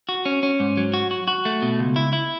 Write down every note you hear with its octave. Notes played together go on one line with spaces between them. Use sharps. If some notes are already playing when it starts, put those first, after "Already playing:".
F#4
C#4
C#4
G#2
F#3
F#4
F#4
F#4
A3
B2
C#2
E4
E4